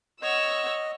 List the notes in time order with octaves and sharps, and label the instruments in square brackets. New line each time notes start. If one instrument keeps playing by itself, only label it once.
[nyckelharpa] C#5 [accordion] D#5 [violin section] F#5 E6